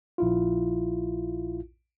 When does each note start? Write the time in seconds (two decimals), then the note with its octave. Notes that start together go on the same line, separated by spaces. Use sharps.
0.18 A#1 E4 F4